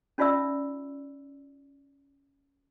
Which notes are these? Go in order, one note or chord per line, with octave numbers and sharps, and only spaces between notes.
C#4 D#4 F4 D5 E5 E6